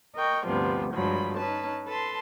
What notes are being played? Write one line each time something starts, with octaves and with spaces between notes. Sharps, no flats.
A#4 D#5 G5 C#6
D2 G2 C3 F3 G3 B3
G2 F3 F#3 G#3 B5
C#4 D#4 B4 A5
A4 B4 A5 C6